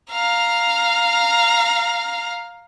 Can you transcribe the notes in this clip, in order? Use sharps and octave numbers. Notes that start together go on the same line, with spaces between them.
F5 A#5